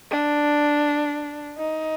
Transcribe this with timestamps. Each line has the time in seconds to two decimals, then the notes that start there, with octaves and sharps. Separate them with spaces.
0.11 D4
1.57 D#4